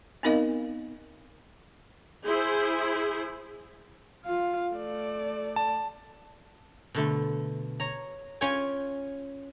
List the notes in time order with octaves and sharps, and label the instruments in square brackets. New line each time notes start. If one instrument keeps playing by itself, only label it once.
[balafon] B3 C4 D#4 A#4 D#5 F5
[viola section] E4 G#4 C5
[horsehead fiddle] F4 F5
A3 D5
[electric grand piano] A5
[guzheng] B2 D3 A3
C#5 A#5
C#4 F4 C#5 G5 G#5